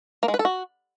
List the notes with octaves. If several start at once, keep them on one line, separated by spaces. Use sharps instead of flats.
A#3
G#3
B4
A4
F#4